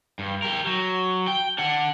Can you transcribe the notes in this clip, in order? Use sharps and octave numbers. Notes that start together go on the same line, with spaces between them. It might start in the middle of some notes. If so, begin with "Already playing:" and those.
G2
G4 A#4
F#3
G5
D4 F#5